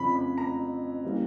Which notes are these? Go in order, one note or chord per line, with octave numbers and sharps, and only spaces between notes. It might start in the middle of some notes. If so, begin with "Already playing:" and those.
Already playing: F2 C#3 F3 B5
B5
A#5
E3 G3 A#3 C#4